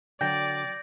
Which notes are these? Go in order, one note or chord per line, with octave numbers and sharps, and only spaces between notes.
D3 F#3 D5 G5 G6 A#6